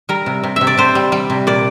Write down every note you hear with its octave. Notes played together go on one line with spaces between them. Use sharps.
G3 A#4
C3
C3
C3 E5
D5
C3 C5
G3
G3
C3
A#2 D5